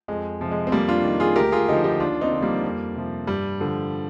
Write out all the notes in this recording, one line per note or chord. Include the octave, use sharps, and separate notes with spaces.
F2 G#3
C3 F3
G#3
C4
F2 G3 A#3
D4 F4
D#3
F4 G#4
D2 G4 A#4
F4 G#4
D3 F3 D#4 G4
D#4 G4
D#2 D4 F4
C4 D#4
D3 F3
G3 A#3
F2
C3 F3
G2 G3
D3 F3